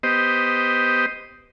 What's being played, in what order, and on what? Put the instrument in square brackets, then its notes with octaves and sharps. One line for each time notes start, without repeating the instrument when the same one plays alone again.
[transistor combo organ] B3 G4 C5 D#5